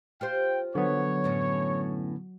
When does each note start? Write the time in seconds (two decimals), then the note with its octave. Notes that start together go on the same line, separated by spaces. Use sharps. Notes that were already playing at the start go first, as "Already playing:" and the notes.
0.21 F4 G4 C5 G5
0.75 D3 F#3 B3 C#5
1.24 F#2 A2 C#4